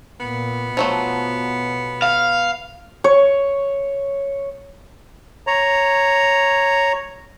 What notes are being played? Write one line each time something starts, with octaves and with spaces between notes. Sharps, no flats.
A#2 B3
B2 F3 F#3 A3
F5
C#5
C#5 A#5